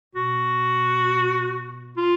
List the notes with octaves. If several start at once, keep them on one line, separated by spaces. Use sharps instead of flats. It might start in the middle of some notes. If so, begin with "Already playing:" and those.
B2 F#4
F4